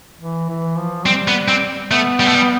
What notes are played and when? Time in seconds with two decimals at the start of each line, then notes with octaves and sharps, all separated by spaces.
0.21 E3
0.49 E3
0.78 F3
1.06 G3 C4
1.28 B3
1.48 C4
1.91 A3 B3
2.20 G3
2.27 A3
2.35 G3